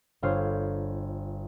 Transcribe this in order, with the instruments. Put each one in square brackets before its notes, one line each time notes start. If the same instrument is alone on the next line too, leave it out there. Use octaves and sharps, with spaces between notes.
[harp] G1 F4 C5 C#5 F5 G6